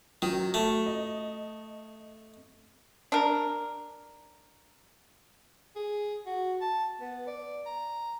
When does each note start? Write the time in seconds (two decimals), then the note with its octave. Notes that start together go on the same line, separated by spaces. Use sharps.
0.22 D#3 F#3
0.54 A3
0.86 D#5
3.12 D4 A#4
5.76 G#4
6.26 F#4
6.61 A5
7.01 B3
7.27 D5
7.66 A#5